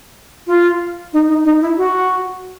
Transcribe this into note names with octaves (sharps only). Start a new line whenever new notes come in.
F4
D#4
D#4
D#4
E4
F#4